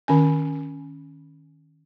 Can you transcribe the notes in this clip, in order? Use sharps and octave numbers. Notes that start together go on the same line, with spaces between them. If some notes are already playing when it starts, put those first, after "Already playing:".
D#3 C#4 G#5